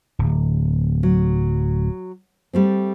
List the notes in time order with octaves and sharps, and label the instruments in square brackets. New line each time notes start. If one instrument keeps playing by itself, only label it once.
[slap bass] D1
[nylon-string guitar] F#3
G3 A3 C4